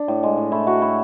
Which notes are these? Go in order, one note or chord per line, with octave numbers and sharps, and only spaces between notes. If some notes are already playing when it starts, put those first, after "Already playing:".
Already playing: D4
A2
G#3
A2
A3 E4
A3 F#4
A3 E4